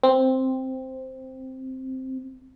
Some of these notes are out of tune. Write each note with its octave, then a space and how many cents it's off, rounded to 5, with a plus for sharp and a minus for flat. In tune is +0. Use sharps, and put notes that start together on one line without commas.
C4 +0